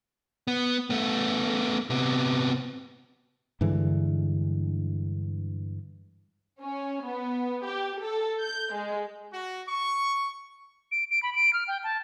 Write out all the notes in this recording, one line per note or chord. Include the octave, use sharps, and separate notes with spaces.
B3
A3 B3
C3 B3
G2 D3 E3 G#3
C#4
B3
G4
A4
G6
G#3
F#4
C#6
D7
D7
B5
D7
F6
G5
A5